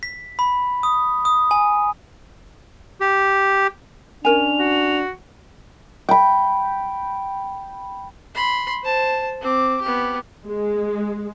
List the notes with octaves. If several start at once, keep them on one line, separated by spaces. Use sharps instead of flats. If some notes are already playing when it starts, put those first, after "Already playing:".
B6
B5
D#6
D#6
G#5
G4
C#4 D4 A#4 G#5 F7
F#4
G5 B5
B5 C6
C5 A5
C4 D6
B3 G4
G#3